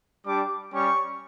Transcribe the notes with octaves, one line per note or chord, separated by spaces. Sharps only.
G3 D4 G4 D6
G3 C#4 G4 C#6